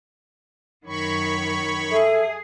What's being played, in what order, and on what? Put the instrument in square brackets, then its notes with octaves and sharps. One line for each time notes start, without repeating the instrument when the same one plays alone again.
[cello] F#2 D#3 [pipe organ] C#5 B5 C#6
[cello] G#4 [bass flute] A4 [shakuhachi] E5